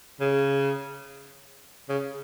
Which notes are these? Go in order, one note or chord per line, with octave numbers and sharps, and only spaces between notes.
C#3
C#3